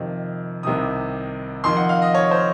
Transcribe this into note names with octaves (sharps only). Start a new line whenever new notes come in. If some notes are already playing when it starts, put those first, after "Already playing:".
Already playing: F2 C3 D#3
C2 C3 D#3 D#6
F2 D#3 C6
F#5
F5
D#5
C#5
C5